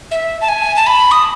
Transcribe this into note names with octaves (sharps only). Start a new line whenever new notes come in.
E5
A5
G#5
A5
B5
D#6